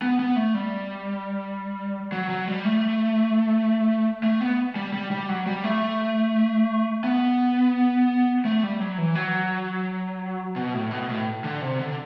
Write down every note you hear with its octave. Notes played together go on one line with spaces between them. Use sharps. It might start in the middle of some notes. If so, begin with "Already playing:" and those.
B3
B3
A3
G3
F#3
F#3
G3
A3
A3
B3
G3
G3
G3
F#3
G3
A3
B3
A3
G3
F#3
E3
F#3
B2
A2
B2
A2
D3
C3
D3